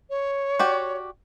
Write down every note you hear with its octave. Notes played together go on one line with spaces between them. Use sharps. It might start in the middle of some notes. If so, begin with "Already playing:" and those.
C#5
F#4 G4 D5